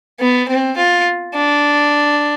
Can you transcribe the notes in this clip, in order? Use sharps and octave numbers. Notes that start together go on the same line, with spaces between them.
B3
C4
F4
D4